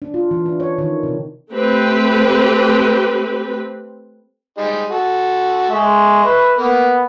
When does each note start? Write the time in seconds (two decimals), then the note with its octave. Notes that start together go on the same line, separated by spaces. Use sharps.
0.02 D4
0.14 F4
0.31 E3
0.46 D4
0.60 C#5
0.78 D#3
1.03 C3
1.52 A3 C4 G4 B4
4.58 G3 G#3 D#4
4.91 F#4 A4
5.71 G#3 E5 C#6
6.25 B4
6.59 A#3 B3